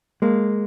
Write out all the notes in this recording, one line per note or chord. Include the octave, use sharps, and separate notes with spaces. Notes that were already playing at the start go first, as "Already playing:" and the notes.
G#3 A#3